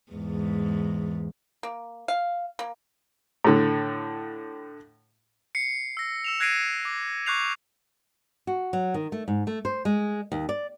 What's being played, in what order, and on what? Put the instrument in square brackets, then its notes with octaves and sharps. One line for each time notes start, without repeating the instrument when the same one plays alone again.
[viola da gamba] E2 G#2
[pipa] A#3
F5
A#3
[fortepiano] A2 D3
[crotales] C7 C#7
E6 A#6
E6 E7 F7
F#6 G#6 A#6 C7 D7 D#7
D6
C#6 D6 F#6 G6 C7 F7
[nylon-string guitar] F#4
F#3
D#3
A3
G#2
A3
C5
G#3
D#2
D5